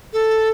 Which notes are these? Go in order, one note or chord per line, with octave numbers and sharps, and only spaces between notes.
A4